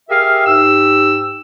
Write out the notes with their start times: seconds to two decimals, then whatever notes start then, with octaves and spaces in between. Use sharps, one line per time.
0.10 G4 G#4 A#4 E5 F5
0.46 G#2 G4 E6